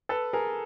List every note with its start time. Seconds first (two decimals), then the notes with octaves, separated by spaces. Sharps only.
0.09 A4 B4
0.33 G#4 A#4